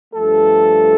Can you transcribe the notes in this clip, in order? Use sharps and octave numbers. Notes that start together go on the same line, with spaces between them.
G2 F3 A3 A4